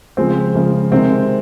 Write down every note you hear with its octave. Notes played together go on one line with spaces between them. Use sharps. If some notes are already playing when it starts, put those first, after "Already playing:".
C#3 F3 G#3 C4
C#3 F3 G#3
C3 D#3 G#3 C4